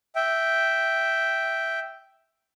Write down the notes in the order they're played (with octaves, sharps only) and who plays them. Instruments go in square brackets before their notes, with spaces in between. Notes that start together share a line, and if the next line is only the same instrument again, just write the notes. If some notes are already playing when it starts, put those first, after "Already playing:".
[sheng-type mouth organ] E5 G5